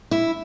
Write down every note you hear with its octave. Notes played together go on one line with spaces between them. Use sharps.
E4